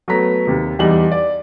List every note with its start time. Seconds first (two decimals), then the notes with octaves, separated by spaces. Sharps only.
0.08 F#3 A3 B3 B4 A#5 B6
0.47 D#2 C3
0.79 E2 G3 D#4 F#7
1.12 D5